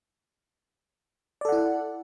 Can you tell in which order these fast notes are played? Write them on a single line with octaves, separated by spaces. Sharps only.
D5 A4 F#5 E4